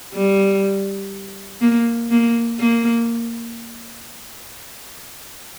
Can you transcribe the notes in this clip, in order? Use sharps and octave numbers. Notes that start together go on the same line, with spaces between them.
G3
A#3
A#3
A#3